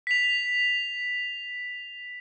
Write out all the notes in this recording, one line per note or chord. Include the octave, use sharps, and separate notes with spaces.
B6 F7